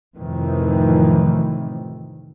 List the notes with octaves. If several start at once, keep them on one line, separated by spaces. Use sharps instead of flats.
F2 A2 C3 D#3 E3